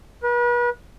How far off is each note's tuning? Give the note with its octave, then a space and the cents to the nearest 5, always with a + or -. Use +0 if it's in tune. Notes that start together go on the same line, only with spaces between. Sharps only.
B4 -40